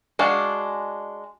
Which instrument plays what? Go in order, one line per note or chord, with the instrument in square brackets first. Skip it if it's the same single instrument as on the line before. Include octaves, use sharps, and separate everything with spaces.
[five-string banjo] G#3 D4 F#4 F5